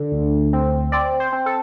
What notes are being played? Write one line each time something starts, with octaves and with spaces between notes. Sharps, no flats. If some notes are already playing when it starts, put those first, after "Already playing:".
Already playing: D3
D2
C4
C4 D5
C5
C4
A4